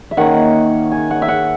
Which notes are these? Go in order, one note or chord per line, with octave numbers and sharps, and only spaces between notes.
E5
D#3 A#3 C#4 F#5
G#5
F#5
E5
F#5